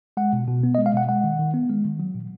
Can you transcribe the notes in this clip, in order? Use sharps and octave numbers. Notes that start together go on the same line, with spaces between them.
G#3 F#5
B2
B2
B3
D#5
G#3
F5
B2 F#5
G#3 F#5
D#3
D#3
B3
G#3
D#3
F#3
A#2